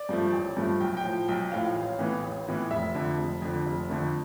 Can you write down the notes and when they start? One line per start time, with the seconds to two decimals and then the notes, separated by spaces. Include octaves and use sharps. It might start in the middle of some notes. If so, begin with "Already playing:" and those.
Already playing: D5
0.09 G2 F3 A3
0.33 A1
0.57 G2 F3 A3
0.80 B1 G5
0.97 G5
1.04 A2 F3
1.28 B1 G5
1.52 A2 F3 F5
1.76 A1 F5
1.99 A2 E3 B3
2.23 A1
2.47 A2 E3 B3
2.71 F1 E5
2.95 F2 D3
3.18 F1
3.42 F2 D3
3.66 F1
3.90 F2 D3 A3